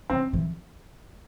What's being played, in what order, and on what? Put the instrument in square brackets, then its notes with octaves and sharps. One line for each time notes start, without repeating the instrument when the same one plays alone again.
[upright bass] E3 [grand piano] C4
[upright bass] E3